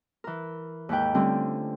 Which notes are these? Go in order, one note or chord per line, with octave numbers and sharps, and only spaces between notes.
E3 A#4
D#2 G#2 B4 G5
D3 G3 A3 C4 C#4 F4